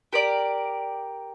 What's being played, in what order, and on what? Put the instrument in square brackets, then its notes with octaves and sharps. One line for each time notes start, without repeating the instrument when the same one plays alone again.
[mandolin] G4 A#4 D5